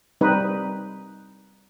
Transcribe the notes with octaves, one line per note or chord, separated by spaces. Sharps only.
G3 C4 D#4 B4